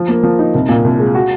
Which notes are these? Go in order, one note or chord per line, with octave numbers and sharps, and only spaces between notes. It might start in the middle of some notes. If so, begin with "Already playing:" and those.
Already playing: F3
A#3
F3
D#4
C2
A#2
C2
G#3
F#4